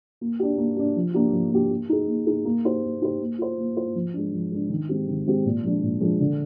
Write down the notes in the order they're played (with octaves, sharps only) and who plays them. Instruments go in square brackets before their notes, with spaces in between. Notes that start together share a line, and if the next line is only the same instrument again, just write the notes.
[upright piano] A#3
D4 G4
A#3
D4 G4
F3
A#3 D4 G4
F3
A#3 D4 G4
A#3
D#4 G#4
A#3
D#4 G#4
A#3
D#4 G4 C5
A#3
D#4 G4 C5
A#3
F4 C5
A#3
F4 C5
F3
G#3 D4
F3
G#3 D4
D#3
G#3 C4 G4
D#3
G#3 C4 G4
A#2
F3 G#3 D4
A#2
F3 G#3 D4
D3